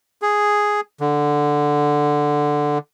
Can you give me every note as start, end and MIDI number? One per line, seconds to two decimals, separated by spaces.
0.22 0.81 68
1.00 2.78 50